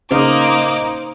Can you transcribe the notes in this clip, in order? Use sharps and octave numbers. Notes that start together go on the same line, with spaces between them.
C#3 A#3 D#4 C5 D#5 F5 D6